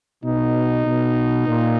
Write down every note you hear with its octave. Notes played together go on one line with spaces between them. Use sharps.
B2 D#4
B2
A#2